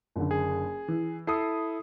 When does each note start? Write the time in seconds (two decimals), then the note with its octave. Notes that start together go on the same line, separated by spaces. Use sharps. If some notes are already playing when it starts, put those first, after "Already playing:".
0.16 F#1 D3
0.31 G#4
0.88 E3
1.27 E4 A4 D#6 C7